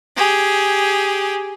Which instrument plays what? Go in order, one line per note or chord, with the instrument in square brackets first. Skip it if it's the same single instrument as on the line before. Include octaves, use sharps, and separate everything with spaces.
[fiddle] G4 G#4